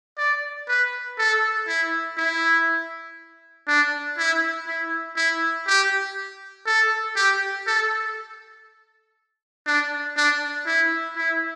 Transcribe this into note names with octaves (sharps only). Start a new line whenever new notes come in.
D5
B4
A4
E4
E4
D4
E4
E4
E4
G4
A4
G4
A4
D4
D4
E4
E4